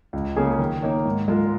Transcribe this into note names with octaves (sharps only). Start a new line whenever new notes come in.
C#2
C#3 A#3 C#4 G#4
D#3
A#3 D#4 C#5
G#2
G#3 F4 A#4